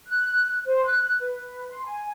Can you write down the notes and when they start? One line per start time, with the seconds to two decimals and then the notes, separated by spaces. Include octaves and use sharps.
0.08 F#6
0.66 C5
0.85 F#6
1.21 B4
1.70 C6
1.85 G#5